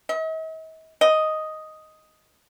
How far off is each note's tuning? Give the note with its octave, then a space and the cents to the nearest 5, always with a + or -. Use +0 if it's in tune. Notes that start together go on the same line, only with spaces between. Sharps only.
D#5 +45
D#5 +5